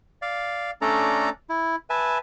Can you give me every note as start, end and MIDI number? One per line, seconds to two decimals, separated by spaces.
0.22 0.71 74
0.22 0.71 77
0.81 1.29 57
0.81 1.29 61
0.81 1.29 62
0.81 1.29 69
0.81 1.29 74
0.81 1.29 82
1.49 1.76 64
1.90 2.18 71
1.90 2.18 76
1.90 2.18 80
1.90 2.18 81